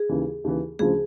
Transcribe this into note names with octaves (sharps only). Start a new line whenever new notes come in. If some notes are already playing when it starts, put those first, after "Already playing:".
Already playing: G#4
D#2 C#3 E3
D#2 C#3 E3
D2 C#3 F3 G#4